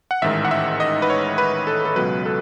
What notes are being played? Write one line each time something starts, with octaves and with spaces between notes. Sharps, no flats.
F#5
A1 G#2 D#3 E5
F#5
E5
D#5
B4
C#5
B4
A4
A4
C#2 B2 F#3 B4
A4